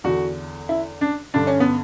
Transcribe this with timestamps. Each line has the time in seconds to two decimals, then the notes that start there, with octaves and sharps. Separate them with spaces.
0.04 E2 D3 F#4
0.69 E4
1.01 D4
1.34 G2 D3 D4
1.47 C#4
1.60 B3